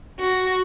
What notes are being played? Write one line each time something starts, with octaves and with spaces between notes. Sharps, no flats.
F#4